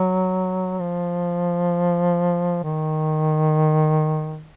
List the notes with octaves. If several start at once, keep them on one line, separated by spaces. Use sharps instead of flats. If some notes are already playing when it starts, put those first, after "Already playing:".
Already playing: F#3
F3
D#3